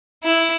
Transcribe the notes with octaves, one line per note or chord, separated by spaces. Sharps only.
E4